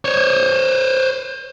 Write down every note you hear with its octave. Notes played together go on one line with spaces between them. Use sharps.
C5 C#5